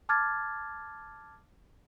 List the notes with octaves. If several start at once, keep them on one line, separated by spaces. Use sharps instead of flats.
A5 D6 F6 G#6 A6